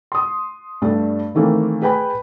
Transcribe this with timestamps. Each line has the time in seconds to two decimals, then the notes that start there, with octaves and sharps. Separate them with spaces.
0.12 C6 D#6
0.82 G2 G3 A3 D4
1.35 D#3 E3 A3 A#3 C4
1.82 G#4 B4 G5 G#5 B5